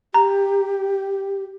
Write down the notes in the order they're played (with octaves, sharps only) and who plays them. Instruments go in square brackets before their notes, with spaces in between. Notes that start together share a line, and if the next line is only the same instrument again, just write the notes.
[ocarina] G4 [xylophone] A#5